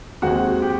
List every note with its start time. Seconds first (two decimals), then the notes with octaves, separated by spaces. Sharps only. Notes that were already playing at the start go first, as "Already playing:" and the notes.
0.22 D#2 D#3 G#3 C4 F#4 F#5
0.62 G4 G5